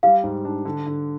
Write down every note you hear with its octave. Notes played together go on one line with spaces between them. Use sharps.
G3 F5
G#2
D4
D3
D3